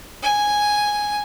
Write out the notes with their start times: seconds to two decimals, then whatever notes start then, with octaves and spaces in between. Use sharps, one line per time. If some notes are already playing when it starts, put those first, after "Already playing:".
0.23 G#5